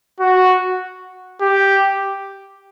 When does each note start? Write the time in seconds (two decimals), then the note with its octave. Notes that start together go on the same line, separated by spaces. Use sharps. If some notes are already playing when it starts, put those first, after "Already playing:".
0.20 F#4
1.41 G4